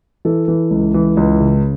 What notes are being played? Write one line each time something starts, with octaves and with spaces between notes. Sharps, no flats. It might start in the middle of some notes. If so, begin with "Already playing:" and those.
E3 A4
E3
C#2
E3
C#2
C#3